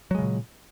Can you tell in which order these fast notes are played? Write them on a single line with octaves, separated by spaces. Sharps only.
F#3 G#3 C#3 A#2